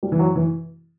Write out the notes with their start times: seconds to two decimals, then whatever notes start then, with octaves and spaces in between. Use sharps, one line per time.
0.03 G3
0.12 E3
0.19 F#3
0.35 E3